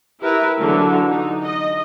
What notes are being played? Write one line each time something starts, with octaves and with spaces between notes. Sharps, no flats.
E4 G4 A#4 B4 E5
D3 E3 F#3
D#4
D#5